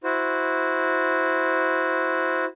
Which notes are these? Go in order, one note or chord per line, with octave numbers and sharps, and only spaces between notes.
E4 F#4 C5